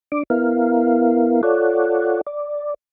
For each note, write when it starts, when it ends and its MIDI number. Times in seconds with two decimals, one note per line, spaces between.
0.12 0.23 62
0.12 0.23 86
0.30 1.41 59
0.30 1.41 64
0.30 1.41 70
0.30 1.41 77
1.43 2.21 65
1.43 2.21 69
1.43 2.21 73
1.43 2.21 74
1.43 2.21 78
2.27 2.74 74